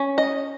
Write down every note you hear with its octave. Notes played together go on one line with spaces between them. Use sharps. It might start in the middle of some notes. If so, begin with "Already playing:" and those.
Already playing: C#4
D#5